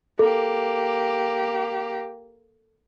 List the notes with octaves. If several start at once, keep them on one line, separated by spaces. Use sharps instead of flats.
A#3 G4 A4